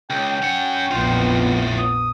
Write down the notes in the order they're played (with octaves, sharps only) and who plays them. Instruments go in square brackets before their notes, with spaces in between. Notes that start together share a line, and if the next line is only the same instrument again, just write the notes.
[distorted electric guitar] C#2 [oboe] G5
[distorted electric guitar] C#4 F#5
[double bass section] A#1 F2 B3 [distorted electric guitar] A2 F4
[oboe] D#6